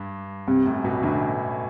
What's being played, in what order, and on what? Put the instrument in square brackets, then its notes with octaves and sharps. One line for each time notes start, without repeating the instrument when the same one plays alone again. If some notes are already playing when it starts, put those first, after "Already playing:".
Already playing: [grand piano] G2
[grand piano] G2 [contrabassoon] C3
[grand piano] F#2 A2
G2 B2
[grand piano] F#2 A2 [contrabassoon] D3